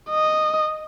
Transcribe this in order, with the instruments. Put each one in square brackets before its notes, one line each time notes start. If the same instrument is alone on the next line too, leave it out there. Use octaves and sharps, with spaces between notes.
[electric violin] D#5